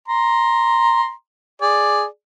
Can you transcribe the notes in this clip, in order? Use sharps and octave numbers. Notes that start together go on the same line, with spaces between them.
A#5 C6
G#4 D5